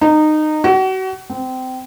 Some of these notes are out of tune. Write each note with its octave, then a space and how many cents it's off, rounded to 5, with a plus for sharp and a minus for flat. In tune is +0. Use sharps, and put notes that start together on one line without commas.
D#4 -20
F#4 +35
C4 -25